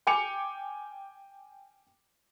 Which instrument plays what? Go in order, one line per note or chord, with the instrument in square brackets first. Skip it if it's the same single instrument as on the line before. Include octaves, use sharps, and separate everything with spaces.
[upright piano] G5 G#5 D6 C#7 F7